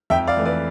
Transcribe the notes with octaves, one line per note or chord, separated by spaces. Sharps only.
F2 E5 G5
D5 F5
E3 A3
B4 D5